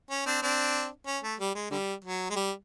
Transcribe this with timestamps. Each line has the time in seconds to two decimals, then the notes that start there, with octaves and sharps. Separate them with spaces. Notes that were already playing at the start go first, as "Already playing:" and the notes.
0.11 C#4
0.26 C4 D4
0.42 C4 D4
1.07 C#4
1.23 A3
1.40 G3
1.55 G#3
1.71 D3 G3
2.04 F#3
2.30 G#3
2.36 G3